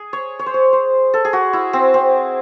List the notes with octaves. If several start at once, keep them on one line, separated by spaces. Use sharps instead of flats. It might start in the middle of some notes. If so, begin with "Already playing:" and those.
Already playing: G#4
C#5
C#5
C5
C#5
C5
A4
G#4
F#4
E4
C4
C4